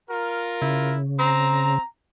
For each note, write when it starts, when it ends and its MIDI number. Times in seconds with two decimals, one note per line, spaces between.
0.10 0.96 65
0.10 0.96 70
0.61 1.78 49
0.61 0.98 64
1.19 1.77 60
1.19 1.84 82